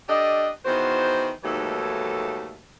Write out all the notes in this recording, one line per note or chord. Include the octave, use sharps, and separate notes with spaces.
D4 G4 A4 D#5
E2 D#3 F#4 C5
D#2 G#2 E3 F#3 A3 A4